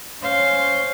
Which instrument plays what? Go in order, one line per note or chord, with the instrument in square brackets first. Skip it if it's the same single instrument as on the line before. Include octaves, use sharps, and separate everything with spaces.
[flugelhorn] C#4 [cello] C5 F5